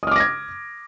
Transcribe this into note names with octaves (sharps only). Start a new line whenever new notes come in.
D6 D#6 F6 G#6 A#6